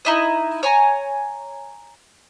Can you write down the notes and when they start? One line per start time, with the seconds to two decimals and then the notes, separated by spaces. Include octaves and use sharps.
0.05 D#4 E4 D#5
0.63 C#5 G#5 A#5